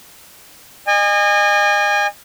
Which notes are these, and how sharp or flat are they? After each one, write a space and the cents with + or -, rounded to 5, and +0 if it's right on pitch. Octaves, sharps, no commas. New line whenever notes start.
D#5 -35 G#5 -30